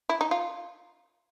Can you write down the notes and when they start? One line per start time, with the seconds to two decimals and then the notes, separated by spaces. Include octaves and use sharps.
0.09 E4
0.21 D#4
0.31 F4